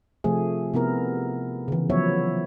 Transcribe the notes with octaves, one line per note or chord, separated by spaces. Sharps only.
C3 F3 A3 G#4
C3 B3 E4 A#4
C#3 E3
F3 F#3 B3 E4 C#5 E5